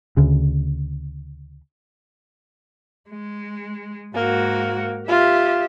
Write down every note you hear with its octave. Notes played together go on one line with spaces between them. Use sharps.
D2 C#3
G#3
G#2 A#3 F#4
F4 G4 E5